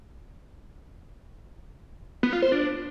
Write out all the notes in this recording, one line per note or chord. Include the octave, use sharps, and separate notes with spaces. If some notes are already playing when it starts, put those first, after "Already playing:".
B3
F4
C5
D4